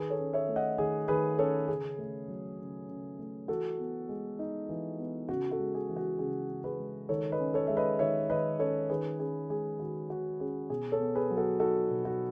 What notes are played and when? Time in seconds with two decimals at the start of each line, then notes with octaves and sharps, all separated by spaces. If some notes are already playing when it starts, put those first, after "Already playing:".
Already playing: D#3 G#4 B4
0.10 A4 C#5
0.19 C#4
0.33 C#5 E5
0.48 A3
0.56 D#5 F#5
0.78 D#3 G#4
1.08 D#3 G#4 B4
1.38 C#4 A4 C#5
1.68 C#3 G#4
1.98 A3
2.28 F#3
2.59 C#3
2.88 C#3
3.19 A3
3.48 E3 F#4 A4
3.79 B3
4.09 G#3
4.39 D#4
4.69 E3
4.99 B3
5.29 C#3 F#4
5.51 F#4 A4
5.59 G#3
5.75 G#4
5.89 E3
5.96 F#4
6.19 C#3 G#4
6.50 C#3
6.64 G#4 B4
6.79 G#3
7.09 D#3 A4 C#5
7.32 B4 D#5
7.40 C#4
7.54 A4 C#5
7.67 G#3 E5
7.77 B4 D#5
7.99 D#3 C#5 E5
8.30 D#3 B4 D#5
8.59 C#4 A4 C#5
8.89 D#3 G#4 B4
9.20 C#4 G#4
9.49 G#3 G#4
9.79 D#3 F#4
10.10 D#3 F#4
10.40 C#4 G#4
10.70 B2 G#4
10.92 A4 C#5
11.00 B3
11.15 G#4 B4
11.30 F#3
11.37 F#4 A4
11.59 D#4 F#4 A4
11.90 B2
12.05 F#4